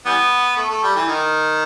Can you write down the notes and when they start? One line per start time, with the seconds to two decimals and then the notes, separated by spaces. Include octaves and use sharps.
0.06 E3 G3 B3
0.57 A3
0.70 A3
0.83 G3
0.96 E3
1.08 D#3